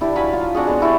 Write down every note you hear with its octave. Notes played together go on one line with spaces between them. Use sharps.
D4 E4 G4
F#3 F5 G#5 B5
F4
C4 D4 F#4 G#4
G#3 B3 C#5
E4 G4 C#5 D5